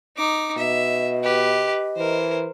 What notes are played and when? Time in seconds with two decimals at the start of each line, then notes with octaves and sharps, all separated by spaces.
0.17 D#4 D6
0.58 B2 D#5 E5
1.23 G4 B4
1.97 E3 A#4 C5